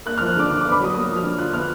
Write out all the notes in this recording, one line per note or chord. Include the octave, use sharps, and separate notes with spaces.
A#3 F#6
F6
F3
F6
D3 D6
D3 D6
D6
B3
B5
F#3 D#6
A#3 D#6
F3
F6
D3
F4 F#6
B3 F6